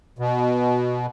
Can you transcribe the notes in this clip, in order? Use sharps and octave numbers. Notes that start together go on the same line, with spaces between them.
B2